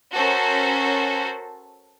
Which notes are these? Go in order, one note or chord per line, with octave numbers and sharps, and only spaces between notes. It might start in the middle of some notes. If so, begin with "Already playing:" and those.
C#4 F#4 A4 A#4 C5